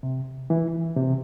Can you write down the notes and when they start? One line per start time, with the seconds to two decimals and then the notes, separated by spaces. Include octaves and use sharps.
0.03 C3
0.50 E3
0.96 C3